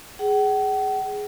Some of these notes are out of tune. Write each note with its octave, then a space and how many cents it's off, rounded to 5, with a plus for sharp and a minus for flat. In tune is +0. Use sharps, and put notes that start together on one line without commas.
G#4 +0 F#5 +45